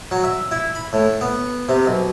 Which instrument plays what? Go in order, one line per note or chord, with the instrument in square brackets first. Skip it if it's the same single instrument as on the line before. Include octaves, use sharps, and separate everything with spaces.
[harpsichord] F#3
E5
E4
B5
A2
B3
C3
B1